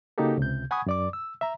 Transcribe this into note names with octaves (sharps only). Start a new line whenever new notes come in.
C#3 A#3 D#4 F#4 G4 A4
C#2 C3 G6
F#5 G#5 B5 C#6 D#6 G#6
F#2 D5 D6
E6
E5 A#5